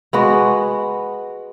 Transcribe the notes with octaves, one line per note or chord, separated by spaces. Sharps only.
G#3 B3 F#4